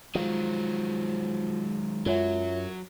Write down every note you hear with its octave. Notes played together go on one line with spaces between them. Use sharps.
D#3 F3 F#3 G#3
F#2 F#3 F4 C#5 E5